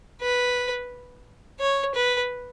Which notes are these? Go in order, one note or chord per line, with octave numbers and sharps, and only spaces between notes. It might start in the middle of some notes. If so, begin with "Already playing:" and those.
B4
C#5
B4